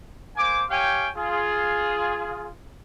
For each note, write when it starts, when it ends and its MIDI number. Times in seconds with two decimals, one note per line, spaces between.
0.37 0.64 58
0.37 0.64 72
0.37 0.64 80
0.37 0.64 86
0.70 1.10 67
0.70 1.10 73
0.70 1.10 77
0.70 1.10 79
0.70 1.10 80
1.16 2.49 65
1.16 2.49 68